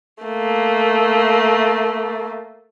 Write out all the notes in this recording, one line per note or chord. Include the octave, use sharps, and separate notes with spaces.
A3 A#3